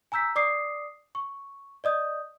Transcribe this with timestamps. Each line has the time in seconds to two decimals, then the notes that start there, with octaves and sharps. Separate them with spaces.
0.12 G#5 A#5 E6 G6 B6
0.36 D5 D6 D#6 C7
1.15 C#6
1.84 D5 D#5 D#6 G6